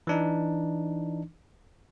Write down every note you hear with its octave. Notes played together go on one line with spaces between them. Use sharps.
E3 D4 D#4